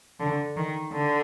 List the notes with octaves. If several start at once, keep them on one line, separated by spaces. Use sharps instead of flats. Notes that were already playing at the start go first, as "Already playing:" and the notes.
D3
D#3
D3